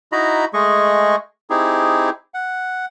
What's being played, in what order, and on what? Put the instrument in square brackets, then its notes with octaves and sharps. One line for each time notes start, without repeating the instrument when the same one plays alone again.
[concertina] D#4 E4 F#4 D#5 A#5 B5
G#3 A3 G#4 D#5 C#6
C4 D#4 E4 G4 G#4
F#5